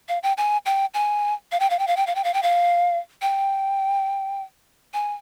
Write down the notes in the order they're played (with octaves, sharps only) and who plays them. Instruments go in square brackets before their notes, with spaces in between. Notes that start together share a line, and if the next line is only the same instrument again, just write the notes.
[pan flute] F5
G5
G#5
G5
G#5
F5
G5
F5
G5
F5
G5
F5
G5
F5
G5
F5
G5
G#5